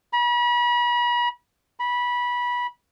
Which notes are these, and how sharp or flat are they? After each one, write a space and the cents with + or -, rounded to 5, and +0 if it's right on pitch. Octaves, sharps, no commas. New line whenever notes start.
B5 -40
B5 -20